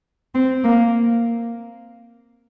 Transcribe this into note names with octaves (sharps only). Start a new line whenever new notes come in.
C4
A#3